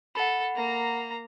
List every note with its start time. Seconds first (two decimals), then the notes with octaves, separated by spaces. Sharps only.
0.15 A4 F#5 B5
0.55 A#3 A#5